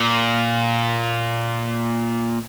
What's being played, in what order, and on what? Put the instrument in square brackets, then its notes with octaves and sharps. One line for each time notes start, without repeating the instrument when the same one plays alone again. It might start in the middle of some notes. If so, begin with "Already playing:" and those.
Already playing: [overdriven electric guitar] A#2